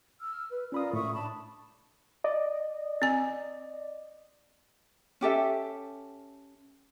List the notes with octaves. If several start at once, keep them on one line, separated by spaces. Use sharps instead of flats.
E6 F6
B4
C#4 F4 A#4 D5 B5 D#6
A2 E5 C#6 D#6
D4 A5 B5
D5 D#5
C4 G#5
C#4 G4 A4 E5